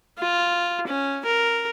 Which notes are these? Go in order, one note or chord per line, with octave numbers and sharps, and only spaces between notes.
F4
C#4
A#4